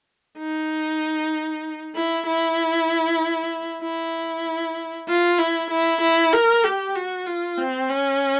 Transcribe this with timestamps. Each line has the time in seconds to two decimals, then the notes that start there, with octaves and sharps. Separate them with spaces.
0.38 D#4
1.95 E4
2.26 E4
3.82 E4
5.08 F4
5.39 E4
5.70 E4
6.01 E4
6.32 A#4
6.64 G4
6.95 F#4
7.26 F4
7.58 C4
7.89 C#4